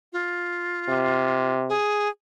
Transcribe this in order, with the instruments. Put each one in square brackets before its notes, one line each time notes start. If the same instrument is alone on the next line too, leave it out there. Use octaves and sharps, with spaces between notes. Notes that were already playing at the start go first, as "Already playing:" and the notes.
[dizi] F4
[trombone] C3
[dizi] G#4